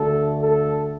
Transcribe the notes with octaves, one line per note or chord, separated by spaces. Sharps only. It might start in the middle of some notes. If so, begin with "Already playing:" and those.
Already playing: D2 D3 A3 A4
A4